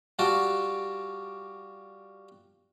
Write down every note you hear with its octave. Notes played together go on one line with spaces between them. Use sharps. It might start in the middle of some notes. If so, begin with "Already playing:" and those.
G3 F4 F#4 A5 D6